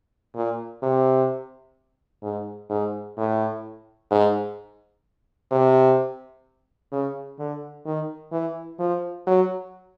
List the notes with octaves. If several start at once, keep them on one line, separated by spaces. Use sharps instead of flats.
A#2
C3
G#2
G#2
A2
G#2
C3
C#3
D3
D#3
E3
F3
F#3